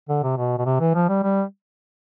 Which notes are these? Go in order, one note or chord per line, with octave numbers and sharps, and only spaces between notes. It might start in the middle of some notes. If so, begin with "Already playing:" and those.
D3
C3
B2
B2
C3
E3
F3
G3
G3